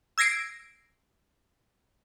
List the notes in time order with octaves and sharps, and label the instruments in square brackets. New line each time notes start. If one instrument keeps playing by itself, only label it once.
[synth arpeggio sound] E6 G#6 A#6 C7 D7